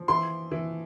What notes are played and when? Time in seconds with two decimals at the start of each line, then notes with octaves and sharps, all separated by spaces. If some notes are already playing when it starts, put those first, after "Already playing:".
Already playing: F3
0.08 E3 C6
0.52 E3